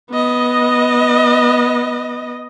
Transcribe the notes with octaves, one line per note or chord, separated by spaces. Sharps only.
B3 D#5